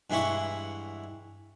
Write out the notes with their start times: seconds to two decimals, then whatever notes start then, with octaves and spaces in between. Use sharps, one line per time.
0.10 G2 E3 G#3 E4 F#5 C#6